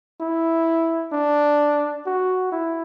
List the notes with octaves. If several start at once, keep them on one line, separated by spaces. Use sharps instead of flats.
E4
D4
F#4
E4